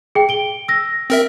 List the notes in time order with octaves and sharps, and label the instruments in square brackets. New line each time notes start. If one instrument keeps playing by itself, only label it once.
[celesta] G#4 G5
D7 G7
E6 A#6
[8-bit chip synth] C4 A#4 E5